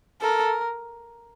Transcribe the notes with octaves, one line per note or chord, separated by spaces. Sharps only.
A4 A#4